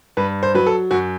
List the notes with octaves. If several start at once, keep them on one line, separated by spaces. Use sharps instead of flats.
G2 B4
C5
F#3 B4
A4
F#2 F#4